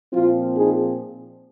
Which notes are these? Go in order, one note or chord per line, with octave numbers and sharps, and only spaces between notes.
A#2 F3 C4 F4
D#4 G#4